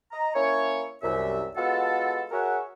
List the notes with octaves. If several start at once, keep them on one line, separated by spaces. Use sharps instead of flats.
D#5 A#5
A#3 C#4 E4 C#5
C2 F#2 E5
G#3 B3 F4 F#4 A4
F#4 G#4 A#4 C#5 E5 F#5